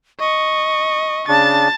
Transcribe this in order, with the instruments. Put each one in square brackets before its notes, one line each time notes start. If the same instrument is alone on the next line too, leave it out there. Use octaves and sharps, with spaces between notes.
[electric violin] D#5 [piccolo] C#6
[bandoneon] C#3 D4 [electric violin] A5 A6